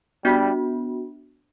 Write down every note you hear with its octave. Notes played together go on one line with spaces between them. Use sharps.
G3 B3 D4 F#4